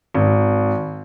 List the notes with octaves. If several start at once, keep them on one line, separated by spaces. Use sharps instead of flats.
G#1